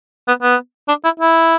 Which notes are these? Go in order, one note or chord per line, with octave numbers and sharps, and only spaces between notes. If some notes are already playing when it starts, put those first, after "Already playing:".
B3
B3
D4
E4
E4